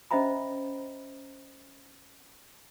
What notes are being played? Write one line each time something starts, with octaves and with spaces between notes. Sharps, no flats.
C#4 C5 D#5 E5 A#5 B5